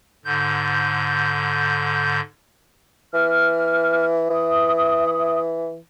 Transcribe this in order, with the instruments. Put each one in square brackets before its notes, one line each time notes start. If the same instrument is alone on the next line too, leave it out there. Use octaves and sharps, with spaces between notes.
[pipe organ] G#2 D3 G6
[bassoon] E3 [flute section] F6
[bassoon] E3 [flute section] E5 D#6